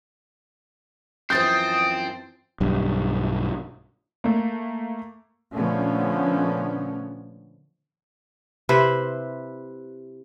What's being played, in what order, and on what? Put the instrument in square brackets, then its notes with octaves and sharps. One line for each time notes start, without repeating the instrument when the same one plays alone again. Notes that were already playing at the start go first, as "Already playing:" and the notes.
[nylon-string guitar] F#2 E3 F3 [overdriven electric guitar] C4 [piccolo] D#6 [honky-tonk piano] G6 A6
[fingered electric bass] B1 G2
[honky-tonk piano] A3 A#3
[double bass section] A#2 D3 F3 A3 B3 C#4
[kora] C3 E4 B4 C5